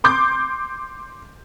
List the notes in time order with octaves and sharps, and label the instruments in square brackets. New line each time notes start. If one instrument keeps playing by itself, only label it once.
[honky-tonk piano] C6 D6 G6